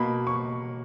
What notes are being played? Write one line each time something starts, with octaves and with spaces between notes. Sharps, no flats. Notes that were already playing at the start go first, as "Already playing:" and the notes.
Already playing: B2 A#3 B5
C#6